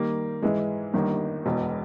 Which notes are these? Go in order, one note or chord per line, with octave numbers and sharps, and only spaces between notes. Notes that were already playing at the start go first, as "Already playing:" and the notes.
Already playing: D#3 G3 A#3
G#2 E3 G#3
G1 G2 D#3 A#3
E1 E2 B2